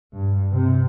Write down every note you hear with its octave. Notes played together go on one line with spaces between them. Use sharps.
G2
C3